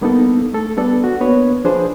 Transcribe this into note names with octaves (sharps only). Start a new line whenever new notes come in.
G3 A#3 B3 D4 D#4 A4
A3 A4
G3 B3 D4 A4 B4 D5
F#4
A#3 B3 D4 B4 C#5
F3 D4 G#4 B4 C5